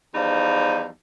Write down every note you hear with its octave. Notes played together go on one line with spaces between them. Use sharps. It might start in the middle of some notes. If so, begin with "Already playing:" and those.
E2 F3 G3 D#4